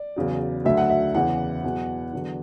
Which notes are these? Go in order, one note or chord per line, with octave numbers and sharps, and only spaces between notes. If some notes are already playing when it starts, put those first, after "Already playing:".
Already playing: D5
E2 C#3 F#3
D2 D3 F#3 E5
F#5
E5
E2 C#3 E3 F#5
E2 B2 F#3
E2 D3 F#3